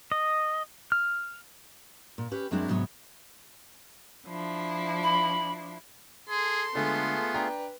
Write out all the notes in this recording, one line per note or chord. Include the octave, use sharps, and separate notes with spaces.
D#5
F6
A#2
C#4 G4 B4
F#2 F#3 G#3 C4 D4 E4
G#2 C3 F#3 B3 C#5
F3 D4 E4
B5
G#4 A4 C6
D3 G#3 A3 B3 F4 G#4
D4 B4 G5 A#5